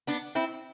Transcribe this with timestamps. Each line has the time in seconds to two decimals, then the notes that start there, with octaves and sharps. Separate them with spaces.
0.07 B3 D4
0.35 C4 E4